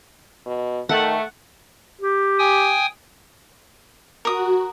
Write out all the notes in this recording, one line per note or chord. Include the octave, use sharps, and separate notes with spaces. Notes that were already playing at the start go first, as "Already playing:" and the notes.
B2
D#3 A3 F#5
G4
G5 G#5 D#6
F#4 A#4 D#6